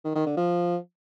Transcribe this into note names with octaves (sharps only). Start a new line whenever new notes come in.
D#3
D#3
D3
F3